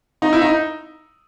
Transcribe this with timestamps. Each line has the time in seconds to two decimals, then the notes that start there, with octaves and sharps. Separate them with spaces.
0.22 D#4
0.33 E4
0.41 D#4